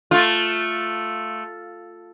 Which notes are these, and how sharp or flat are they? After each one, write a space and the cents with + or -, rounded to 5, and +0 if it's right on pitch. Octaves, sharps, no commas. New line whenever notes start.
A3 +0 F4 +5